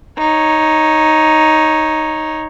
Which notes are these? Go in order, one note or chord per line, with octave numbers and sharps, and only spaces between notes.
D#4 C#5